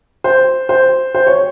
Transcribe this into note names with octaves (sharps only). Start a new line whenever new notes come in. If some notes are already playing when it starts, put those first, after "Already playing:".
C5
C5
C5
C#5